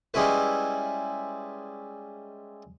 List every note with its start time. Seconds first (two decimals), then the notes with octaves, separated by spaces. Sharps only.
0.14 G3 G#3 C#4 E4 B4